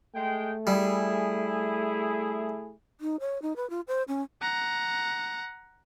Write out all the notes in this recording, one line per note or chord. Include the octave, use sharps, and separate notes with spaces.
G#3 A3 G5
G3 E4 G#4
D#4
C#5
D#4
B4
F4
C5
C#4
F#5 A#5